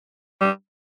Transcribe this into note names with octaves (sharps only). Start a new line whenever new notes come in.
G3